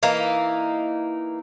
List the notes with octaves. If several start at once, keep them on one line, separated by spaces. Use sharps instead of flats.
E3 A#3 D#4